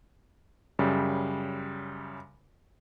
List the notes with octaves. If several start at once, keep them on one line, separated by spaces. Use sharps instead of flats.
F#2 C#3 G3